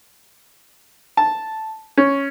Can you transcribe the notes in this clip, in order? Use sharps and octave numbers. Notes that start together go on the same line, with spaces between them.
A5
C#4